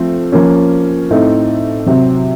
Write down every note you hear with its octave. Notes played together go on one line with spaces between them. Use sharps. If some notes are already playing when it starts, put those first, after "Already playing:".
Already playing: F3 A3 C4
F3 A#3 C#4
A2 A3 C4 D#4
C3 F#3 C4